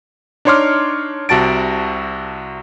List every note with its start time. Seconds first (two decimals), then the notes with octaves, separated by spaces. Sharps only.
0.45 D4 D#4 C#5 C6 D6 F6
1.29 C2 C3 F#4 A5 A6 D7